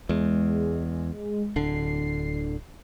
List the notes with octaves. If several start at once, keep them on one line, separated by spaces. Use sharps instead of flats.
E2 G#3
D1 D3 C7